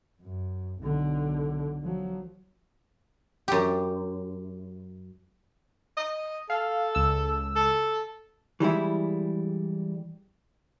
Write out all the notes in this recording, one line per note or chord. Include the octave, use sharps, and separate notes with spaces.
F#2
B1 D3
F3 F#3
F#2 G4
D#5
A4 F5
C#2 E6
A4
E3 G3 G#3 E4